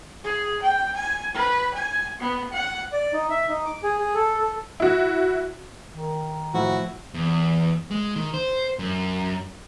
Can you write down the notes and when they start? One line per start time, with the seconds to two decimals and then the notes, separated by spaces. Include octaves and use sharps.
0.24 G#4
0.62 G5
0.96 G#5
1.35 B4
1.74 G#5
2.20 B3
2.53 F#5
2.92 D5
3.13 D#4
3.30 E5
3.49 D#4
3.66 D6
3.83 G#4
3.99 G#4
4.14 A4
4.38 A4
4.80 E4 F#4
5.92 D#3
6.54 A2 F3 E4 F#4
7.14 E2
7.91 G#3
8.16 D#3
8.34 C5
8.79 F#2